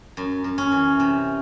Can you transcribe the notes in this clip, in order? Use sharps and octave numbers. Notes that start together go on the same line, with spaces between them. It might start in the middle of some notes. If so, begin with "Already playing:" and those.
F#2
F#2
C#4
E3
C3